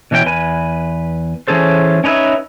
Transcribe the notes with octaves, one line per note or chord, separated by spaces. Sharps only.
B2 E3 C#4 C#5 G5
E2 B4 G#5
E3 C#4 G#4 A4 C5
C#4 D#4 B4 C#5 E5